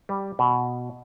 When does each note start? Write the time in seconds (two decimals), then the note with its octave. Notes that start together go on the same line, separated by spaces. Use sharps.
0.09 G3
0.39 B2